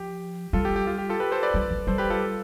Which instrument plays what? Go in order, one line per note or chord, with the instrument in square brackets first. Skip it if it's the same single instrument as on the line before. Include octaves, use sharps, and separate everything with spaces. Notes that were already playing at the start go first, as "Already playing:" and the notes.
Already playing: [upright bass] F3 [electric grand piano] G4
[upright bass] G3 [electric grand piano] F4 A4
[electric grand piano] G4
G4
F4
G4
F4 A4
G4 B4
A4 C5
B4 D5
[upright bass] G3
F3
[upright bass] G3 [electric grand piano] A4 C5
[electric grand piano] G4 B4
F4 A4